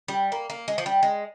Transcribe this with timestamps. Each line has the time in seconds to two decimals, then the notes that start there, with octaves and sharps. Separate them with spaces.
0.08 G3
0.32 A#3
0.50 A#3
0.68 G#3
0.78 F3
0.86 G3
1.03 G#3